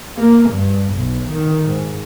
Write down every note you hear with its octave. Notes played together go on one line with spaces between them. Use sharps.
A#3
G2
B1
D#3
G#2